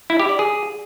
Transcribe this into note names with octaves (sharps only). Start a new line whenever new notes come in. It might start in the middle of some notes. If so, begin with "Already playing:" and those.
E4
G4
D5
G#4